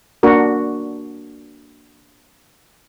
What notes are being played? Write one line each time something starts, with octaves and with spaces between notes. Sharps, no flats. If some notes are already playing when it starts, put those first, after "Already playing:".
A#3 D4 F#4 A#4